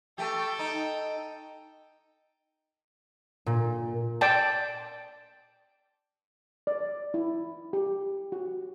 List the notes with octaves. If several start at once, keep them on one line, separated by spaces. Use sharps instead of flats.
A3 G4 A4 G5
D#4
A#2
D5 G5 A5
D5
E4
G4
F#4